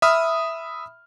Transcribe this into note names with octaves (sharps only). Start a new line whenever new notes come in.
E5 B5 D#6 F6